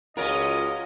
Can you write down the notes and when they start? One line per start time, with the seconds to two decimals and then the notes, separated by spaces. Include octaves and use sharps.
0.17 C#2 C#4 F4 F#4 A#4 D#5